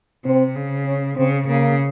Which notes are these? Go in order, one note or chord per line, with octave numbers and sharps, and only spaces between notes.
C3 C4
C#3
C#4
C#3 C4
C#3 A#3